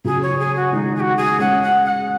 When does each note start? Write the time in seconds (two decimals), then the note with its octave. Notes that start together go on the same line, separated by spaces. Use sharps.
0.05 C#3 F#3 G#4
0.22 C#5
0.39 G#4
0.56 F#4
0.72 D#3 G#3 D#4
0.95 G#4
1.00 F#4
1.17 G#4
1.40 G#3 C#4 F#5
1.62 F#5
1.85 F#5